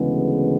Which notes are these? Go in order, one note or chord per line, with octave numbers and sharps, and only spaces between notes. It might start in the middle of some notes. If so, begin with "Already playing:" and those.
Already playing: D2 C#3 E3 G#3 B3